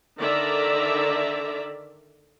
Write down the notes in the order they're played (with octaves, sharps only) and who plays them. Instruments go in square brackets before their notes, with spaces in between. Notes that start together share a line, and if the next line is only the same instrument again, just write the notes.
[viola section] D3 D#3 D5 E5 A#5